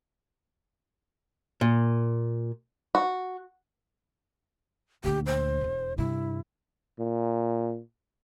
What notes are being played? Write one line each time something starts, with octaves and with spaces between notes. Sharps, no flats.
A#2
F#4
D2 A#2 G4
C5
E1 E2
G2 C3 E4
A#2